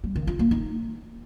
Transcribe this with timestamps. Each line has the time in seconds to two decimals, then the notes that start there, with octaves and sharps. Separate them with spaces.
0.04 G3
0.16 D#3
0.27 F4
0.39 A#3
0.51 D#4